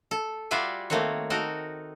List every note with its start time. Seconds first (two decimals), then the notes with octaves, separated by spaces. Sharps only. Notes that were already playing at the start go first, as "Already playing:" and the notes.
0.11 A4
0.51 G3 F4 F#4 D5 E5 G#5
0.90 D#3 A3 A#3 C4 F#4 C#5
1.30 D#4 F#4 A4 A#4